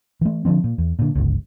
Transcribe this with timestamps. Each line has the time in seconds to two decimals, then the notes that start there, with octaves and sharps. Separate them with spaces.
0.21 E3 A3
0.45 D3 F3 G3 C4
0.64 A#2
0.78 E2
0.99 A#2 D3
1.15 G1 C#2